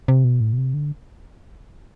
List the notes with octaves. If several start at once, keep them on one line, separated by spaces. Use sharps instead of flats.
C3
B2
A2
B2
C3
D3